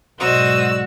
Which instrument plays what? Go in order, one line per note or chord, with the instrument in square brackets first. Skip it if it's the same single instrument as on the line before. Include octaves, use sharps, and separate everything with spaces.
[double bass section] B1 G#2 [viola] F#4 [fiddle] C5 D#5 [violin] D5 E6